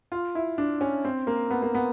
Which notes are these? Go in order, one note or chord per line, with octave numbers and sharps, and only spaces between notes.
F4
E4
D4
C#4
C4
A#3
B3
A#3
B3